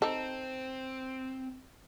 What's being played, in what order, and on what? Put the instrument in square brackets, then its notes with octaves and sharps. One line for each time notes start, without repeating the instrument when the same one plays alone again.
[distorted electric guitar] C4 [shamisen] D#4 A4